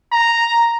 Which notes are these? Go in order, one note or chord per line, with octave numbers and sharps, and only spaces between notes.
A#5